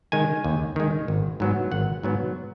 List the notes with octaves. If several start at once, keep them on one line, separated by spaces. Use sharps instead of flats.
D#3 G#3 G#5
D#2
D#3 G#3
G#1
G#2 F#3 B3
G#1 F#5
G#2 F#3 B3